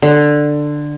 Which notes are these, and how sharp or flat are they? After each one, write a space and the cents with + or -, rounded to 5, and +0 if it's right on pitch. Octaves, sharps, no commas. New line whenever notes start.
D3 +10